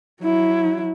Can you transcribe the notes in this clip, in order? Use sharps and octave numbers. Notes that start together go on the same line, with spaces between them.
F#3 E4